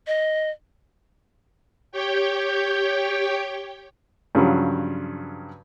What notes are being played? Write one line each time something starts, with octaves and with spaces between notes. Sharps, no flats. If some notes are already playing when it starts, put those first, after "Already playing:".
D#5
G4 C#5 G5
G2 C#3 F3 F#3